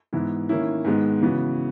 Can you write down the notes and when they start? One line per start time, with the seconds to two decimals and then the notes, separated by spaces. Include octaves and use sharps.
0.13 G#2 E3 B3 E4
0.49 D#3 A#3 C#4 E4
0.85 G#2 D#3 G#3 B3
1.21 C#3 E3 B3 F#4